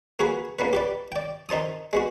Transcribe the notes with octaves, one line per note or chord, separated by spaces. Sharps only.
A#3 F#4 G#4 B4
C#2 A#3 B3 B4
G4 B4 D5
D5 G5
D#3 D#4 C5 A5 D#6
G#3 B3 F#4